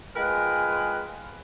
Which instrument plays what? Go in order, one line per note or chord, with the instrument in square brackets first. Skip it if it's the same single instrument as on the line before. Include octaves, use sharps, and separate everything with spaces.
[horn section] G#3 F4 A#4 B4 G5 G#5